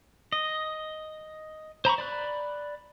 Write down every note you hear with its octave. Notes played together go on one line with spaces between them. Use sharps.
D#5
C5 A#5 B5 C#6
D5 B5 F#6